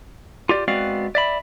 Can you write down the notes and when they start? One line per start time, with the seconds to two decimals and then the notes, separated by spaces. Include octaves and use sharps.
0.49 F4 G4 D5
0.68 G#3 B3 C4 F#4 D5 F5
1.15 D5 E5 B5